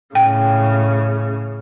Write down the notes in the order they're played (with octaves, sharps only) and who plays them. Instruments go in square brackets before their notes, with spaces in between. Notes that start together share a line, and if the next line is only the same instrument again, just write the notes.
[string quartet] A2 C#3 [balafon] G5